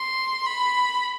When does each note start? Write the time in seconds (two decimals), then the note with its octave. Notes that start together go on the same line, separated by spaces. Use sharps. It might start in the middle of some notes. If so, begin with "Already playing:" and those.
Already playing: C6
0.46 B5